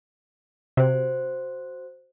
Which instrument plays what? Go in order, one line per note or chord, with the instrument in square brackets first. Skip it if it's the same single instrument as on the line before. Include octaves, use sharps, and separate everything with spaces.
[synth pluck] C3 [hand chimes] F#4 C5